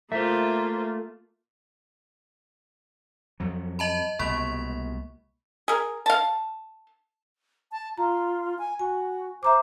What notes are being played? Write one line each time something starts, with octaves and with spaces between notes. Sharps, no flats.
A3 A#3 F4 C5 E5
F2 F#3
D#5 A5 B5
C2 B2 G#3 A#3 B5
G#4 A#4
F5 A5
A5
F4 A#5
G#5
F#4 G#5
C5 E5 A#5 D6